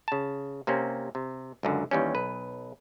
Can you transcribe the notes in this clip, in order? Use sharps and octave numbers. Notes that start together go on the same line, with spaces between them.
C#3 A5
C3 A#3 C4 C#4
C3
C#2 F#2 D3
D#2 E3 G3 C#4
B1 B4